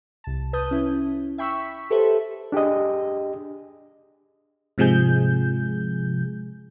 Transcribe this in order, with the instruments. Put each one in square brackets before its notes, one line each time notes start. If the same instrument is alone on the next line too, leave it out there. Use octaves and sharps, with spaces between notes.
[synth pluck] C2 A5
B4 A5 D#6 G6
C#4 E4
E5 G5 B5 C#6 E6 B6
G4 A4 B4 C5 E5
[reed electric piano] D4 G4 G#4 D#5
[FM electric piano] G#2 C3 F3 G#3 G#4 G6